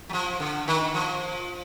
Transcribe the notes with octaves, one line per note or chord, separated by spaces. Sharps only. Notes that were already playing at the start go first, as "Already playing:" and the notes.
F#3
F3
D3
D#3
F3